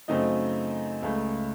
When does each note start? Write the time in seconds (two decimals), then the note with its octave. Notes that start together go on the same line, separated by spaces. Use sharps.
0.08 F#2 C#3 A3 C4 D#4 D#5
1.03 C#2 C#3 A3